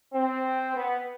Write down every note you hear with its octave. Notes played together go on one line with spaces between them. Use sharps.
C4
B3